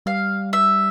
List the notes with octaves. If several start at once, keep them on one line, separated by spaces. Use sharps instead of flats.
G3 F5
E5